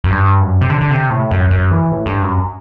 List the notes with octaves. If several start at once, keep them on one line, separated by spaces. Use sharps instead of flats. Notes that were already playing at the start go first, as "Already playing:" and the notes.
F#2
G2
F#2
C3
D3
D3
C3
A2
F#2
F#2
E3
A2
G2
F#2